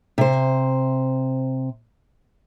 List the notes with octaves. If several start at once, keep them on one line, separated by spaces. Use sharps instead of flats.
C3 C5